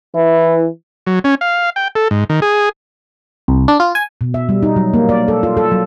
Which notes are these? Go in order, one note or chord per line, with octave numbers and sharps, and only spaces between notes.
E3 E4
F#3
C#4
F5
G5
A4
G#2
D#3
G#4
C2
D4
F4
G#5
B2
E5
G3
D#4
F#3
A#3
D5
A4
F4
A4
F#3